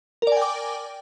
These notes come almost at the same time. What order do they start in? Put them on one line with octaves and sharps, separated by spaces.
A#4 D5 G#5 G5 D6